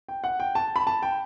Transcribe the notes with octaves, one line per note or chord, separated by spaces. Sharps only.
G5
F#5
G5
A5
B5
A5
G5